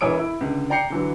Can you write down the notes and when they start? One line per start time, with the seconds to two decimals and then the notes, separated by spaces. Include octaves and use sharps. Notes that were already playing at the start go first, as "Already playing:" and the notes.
0.01 E1 E3 C#5 D#6 D7
0.19 E4
0.41 C#2 D3
0.70 D5 G5 A#5 G6 C7 C#7
0.90 D3 E3 F#3